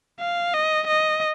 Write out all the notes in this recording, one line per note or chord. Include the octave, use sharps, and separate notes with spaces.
F5
D#5
D#5